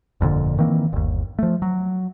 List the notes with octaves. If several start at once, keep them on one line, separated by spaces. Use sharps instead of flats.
G1 F2 A#2 D3
D#3 E3 A#3 C4
G1 D#2
F3 A3
F#3